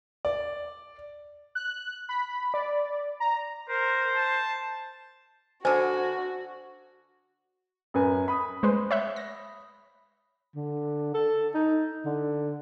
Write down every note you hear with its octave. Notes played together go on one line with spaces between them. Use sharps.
D5
F#6
B5
D5
A#5
A#4 C5
A5
D3 F#4 C5 G#5
F#2 B4 G#5
B5 D#6
G#3 B4 C5
C#5 E5 F#6
A#6
D3
A4
D#4
D3